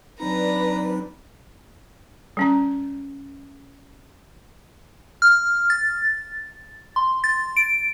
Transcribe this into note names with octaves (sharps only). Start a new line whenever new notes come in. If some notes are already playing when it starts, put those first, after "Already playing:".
F#3 C4 D4 D#4 B4 A#5
G3 C#4 A#5
F6
A6
C6
A6
D7